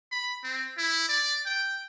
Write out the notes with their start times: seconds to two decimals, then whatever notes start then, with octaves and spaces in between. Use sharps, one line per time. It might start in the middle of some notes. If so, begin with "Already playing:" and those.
0.11 B5
0.44 C4
0.78 E4
1.09 D5
1.46 G5